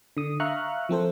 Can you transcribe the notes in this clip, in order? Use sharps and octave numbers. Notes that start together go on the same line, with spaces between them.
D3 D#6
E5 F5 A#5 C#6 F6 F#6
F3 C4 A4 C5